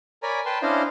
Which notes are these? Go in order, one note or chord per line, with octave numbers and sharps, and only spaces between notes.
A#4 C#5 D5 G#5 A#5 B5
B4 G5 A5 C6
C#4 D4 E4 C5 D#5 F5